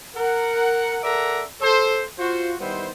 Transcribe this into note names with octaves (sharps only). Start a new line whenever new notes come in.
A#4 F#5
A4 A#4 D5 E5 F#5 A#5
A4 C5
F4 F#4 C5
D#3 G3 B3 E4 C5